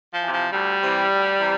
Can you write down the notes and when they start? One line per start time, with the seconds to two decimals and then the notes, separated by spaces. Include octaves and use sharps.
0.13 F3
0.22 C3 E3
0.32 F3
0.52 D2 G3
0.81 C3 E3
1.10 D2
1.39 C3 E3